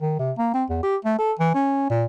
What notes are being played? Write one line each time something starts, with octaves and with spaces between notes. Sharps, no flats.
D#3
C3
A#3
C4
E2
G4
A3
A4
E3
C#4
A#2